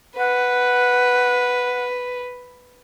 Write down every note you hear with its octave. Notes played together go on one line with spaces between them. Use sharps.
B4 F#5